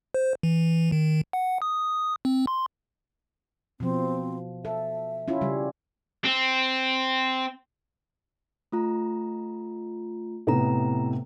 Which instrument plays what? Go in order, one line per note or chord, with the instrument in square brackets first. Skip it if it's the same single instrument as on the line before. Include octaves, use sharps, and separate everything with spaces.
[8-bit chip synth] C5
E3
D#3
F#5
D#6
C4
C6
[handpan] B2 F3 [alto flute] C4
[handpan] A4 [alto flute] E5
[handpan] C#4 E4 F4
C#3 G3
[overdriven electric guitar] C4
[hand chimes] A3 F4 A#5
[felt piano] A2 C3 B3 [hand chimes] D#5 A#5